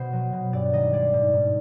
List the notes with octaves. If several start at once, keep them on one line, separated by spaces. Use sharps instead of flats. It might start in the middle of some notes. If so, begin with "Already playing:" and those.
Already playing: B2 C5
F#3
B2
G2 D5
D#3 D#5
G#3 D5
G#2
G#2